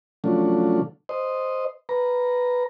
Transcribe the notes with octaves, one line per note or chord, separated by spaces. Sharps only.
C#3 F3 F#3 A3 D4
C5 D#5
B4 A#5